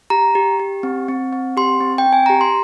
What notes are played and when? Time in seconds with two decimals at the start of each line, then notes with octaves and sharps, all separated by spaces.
0.10 G4 A#5
0.35 G4
0.60 G4
0.83 C4
1.08 C4
1.33 C4
1.57 G4 C6
1.81 C4
1.98 G5
2.06 C4
2.13 G#5
2.26 G4 A#5
2.41 C6